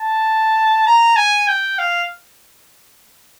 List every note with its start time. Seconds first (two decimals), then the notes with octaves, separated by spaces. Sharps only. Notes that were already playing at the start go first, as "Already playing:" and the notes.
Already playing: A5
0.86 A#5
1.16 G#5
1.47 G5
1.79 F5